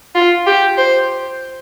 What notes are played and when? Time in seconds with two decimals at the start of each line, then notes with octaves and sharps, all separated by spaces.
0.15 F4
0.47 G4
0.78 C5